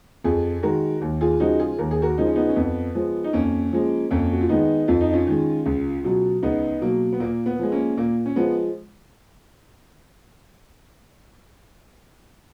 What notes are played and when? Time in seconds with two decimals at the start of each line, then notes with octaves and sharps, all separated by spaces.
0.24 F2 F4 G#4
0.63 D#3 G#3 F#4 A#4
1.01 D#2
1.21 F4 G#4
1.40 C#3 F3 G#3 D#4 F#4
1.59 F4 G#4
1.79 D#2 A#4
1.91 G#4
2.02 F#4 A#4
2.18 C#3 F3 G#3 D#4
2.26 C#4
2.35 B3 D#4
2.49 C#4
2.56 F2 B3
2.95 F3 G#3
3.24 D#4
3.33 F2 A#3 C#4
3.73 F3 G#3
4.11 F2 A#3 C#4
4.32 F#4
4.41 F4
4.49 D#3 G#3 B3 D#4
4.88 F2 F4
5.01 D#4
5.13 C#4 F4
5.27 D#3 G#3
5.66 C#2
6.04 B2 F#3
6.43 C#2 B3 D#4
6.82 B2 F#3 A#3
7.13 B3
7.20 A#2 A#3
7.46 B3
7.59 F3 G#3
7.72 A#3 C#4
7.97 A#2 A#3
8.26 C#4
8.36 F3 G#3 B3